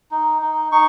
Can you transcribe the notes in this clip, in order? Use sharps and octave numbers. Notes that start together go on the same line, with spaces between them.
D#4
D#4
D#4 C#6